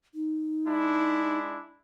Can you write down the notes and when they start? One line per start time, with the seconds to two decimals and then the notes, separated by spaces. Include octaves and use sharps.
0.14 D#4
0.66 G#3 D4 E4